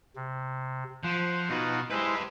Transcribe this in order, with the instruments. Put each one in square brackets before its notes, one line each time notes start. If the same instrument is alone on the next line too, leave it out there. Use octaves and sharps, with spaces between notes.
[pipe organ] C3
[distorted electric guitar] F3 [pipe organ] C5 F#5
[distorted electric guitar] B2 B4 [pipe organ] D#4 F4 F#4
[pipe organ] G#3 E4 C5 [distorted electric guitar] G4 B4